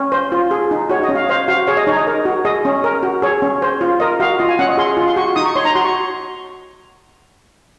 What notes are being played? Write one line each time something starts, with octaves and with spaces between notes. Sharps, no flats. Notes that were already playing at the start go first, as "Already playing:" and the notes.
Already playing: C#4
C5
F4
G#4
D#4
F#4 C#5
D#5
C#4
F5
C5 F5
F#4 F5
G#4 C#5
D#5
D#4 C#5
D#5
A#4
F#4
G#4 D#5
C#4
A#4
F#4
G#4 C#5
C#4
C5
F4
A#4 D#5
F#4 F5
F4 D#5
G#5
C#4 F#5
D#5
G#4 C6
F4
C6
F#4 C#6
D#4 D#6
C#6
C#5 C6
A#5
F#4 C6
C#6